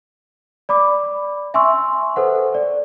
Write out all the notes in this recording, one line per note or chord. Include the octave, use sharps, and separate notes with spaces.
D5 B5 D6
E5 G#5 C6 C#6 E6
A4 B4 C5 F#5
D5